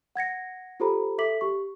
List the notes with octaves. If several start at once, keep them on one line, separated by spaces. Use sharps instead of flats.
F#5 G#6 A#6 C#7
F4 G4 A4 C5 A#5 B5
A4 E5 D6 B6 F#7
G4 C#6